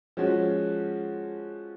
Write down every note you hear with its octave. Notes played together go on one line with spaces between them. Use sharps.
F3 G#3 C#4 F#4